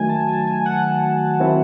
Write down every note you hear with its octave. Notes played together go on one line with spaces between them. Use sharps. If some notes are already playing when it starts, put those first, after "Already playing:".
Already playing: D#3 F#3 A3 G#5
A5
G#5
G#5
F#5
D#3 F#3 C4 E4